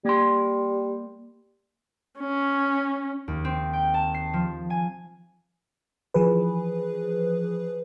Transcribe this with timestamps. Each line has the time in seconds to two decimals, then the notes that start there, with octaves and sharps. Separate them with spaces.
0.05 G3 A#3 C6
2.19 C#4
3.28 D#2
3.45 C4
3.73 G5
3.94 A5
4.14 C7
4.33 F3
4.70 G#5
6.14 E3 F3 G#4 B4